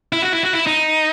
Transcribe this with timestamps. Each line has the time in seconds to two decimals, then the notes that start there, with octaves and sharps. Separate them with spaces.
0.13 E4
0.22 F#4
0.33 E4
0.43 F#4
0.53 E4
0.67 D#4